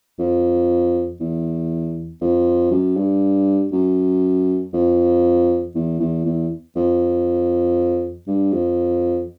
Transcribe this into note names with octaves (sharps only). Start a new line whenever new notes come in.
F2
E2
F2
F#2
G2
F#2
F2
E2
E2
E2
F2
G2
F2